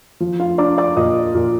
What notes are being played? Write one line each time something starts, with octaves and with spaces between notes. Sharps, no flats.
F3
F4 F5
D4 D5 D6
D5 D6
A#2 D#5 D#6
A#2